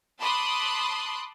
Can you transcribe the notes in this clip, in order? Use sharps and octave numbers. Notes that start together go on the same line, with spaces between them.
A5 B5 C6 D6 D#6 F#6